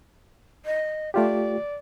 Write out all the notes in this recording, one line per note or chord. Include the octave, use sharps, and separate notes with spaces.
D#5
A3 F4 G4 D5